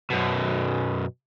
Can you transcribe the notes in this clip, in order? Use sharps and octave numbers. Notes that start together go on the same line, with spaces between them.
F#2 B2